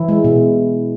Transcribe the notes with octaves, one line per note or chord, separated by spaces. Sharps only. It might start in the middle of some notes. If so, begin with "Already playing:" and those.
Already playing: E3 E4
G#3
B2